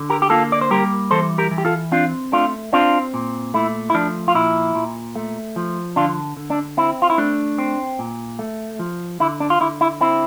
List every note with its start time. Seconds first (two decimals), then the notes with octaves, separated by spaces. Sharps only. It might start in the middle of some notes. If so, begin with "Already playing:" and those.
Already playing: D3
0.10 G4 A#4
0.22 G4
0.30 A#3 F4 A4
0.52 D5
0.61 C5
0.71 G3 G4 A#4
1.11 E3 A4 C5
1.38 G4 A#4
1.51 E3
1.58 G4
1.65 F4 A4
1.92 C4 D4 F4
2.32 A3 D4 F4
2.73 C4 D4 F4
3.14 A#2
3.54 A3 E4
3.90 E4
3.94 F3 D4
4.28 F4
4.34 A#2 E4
4.75 A#2
5.15 A3
5.56 F3
5.96 D3 D4 F4
6.37 D3
6.50 D4
6.77 C4 E4
7.02 F4
7.10 E4
7.18 A3 D4
7.59 C4
7.99 A#2
8.39 A3
8.79 F3
9.20 D3 E4
9.40 D4
9.50 F4
9.60 D3 E4
9.81 E4
10.01 C4 E4